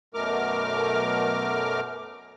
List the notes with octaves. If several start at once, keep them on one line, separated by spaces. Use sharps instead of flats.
F#2 B2 A3 A#4 D6 F6